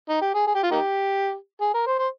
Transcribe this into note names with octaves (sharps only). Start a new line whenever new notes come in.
D#4
G4
G#4
G#4
G4
F4
A#3 D#4 G4
G#4
A#4
C5
C5